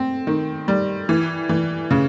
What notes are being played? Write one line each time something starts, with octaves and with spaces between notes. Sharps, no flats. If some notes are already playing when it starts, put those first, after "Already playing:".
Already playing: C4
D#3
G3
E3
E3
C#3